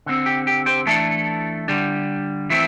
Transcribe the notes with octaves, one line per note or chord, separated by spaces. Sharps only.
D3 C4
G4
G4
G4 C5
E3 A3 D4 E4 A4
D3 G3 D4
E3 A3 C4 E4